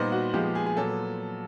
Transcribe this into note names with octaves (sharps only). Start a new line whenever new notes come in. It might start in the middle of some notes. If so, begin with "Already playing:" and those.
Already playing: A#2 G3 B3 D#4 C5
F#4
A#2 F3 G#3 B3 G4
G#4
G#4
A#2 F#3 B3 A4